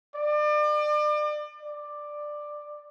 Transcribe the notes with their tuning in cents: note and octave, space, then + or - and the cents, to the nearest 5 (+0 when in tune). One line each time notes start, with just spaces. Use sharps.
D5 +35
D5 +10